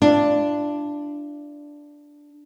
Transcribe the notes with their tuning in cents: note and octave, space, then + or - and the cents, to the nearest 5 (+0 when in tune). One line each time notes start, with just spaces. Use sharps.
D4 +0 F4 -45